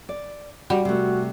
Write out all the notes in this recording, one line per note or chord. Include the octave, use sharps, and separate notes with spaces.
D5
G3 F#4
C3 A3 F#4